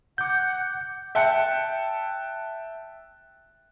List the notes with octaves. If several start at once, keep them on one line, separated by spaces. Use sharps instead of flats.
F#5 D6 G6
E5 G5 A5 F#6 C#7